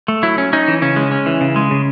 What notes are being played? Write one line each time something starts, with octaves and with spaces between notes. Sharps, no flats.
A3
F#3 E4
C#4
C#4 D#4
E3
C#3 C#4
G#3
C#4
E3
C#3
G#3
C#3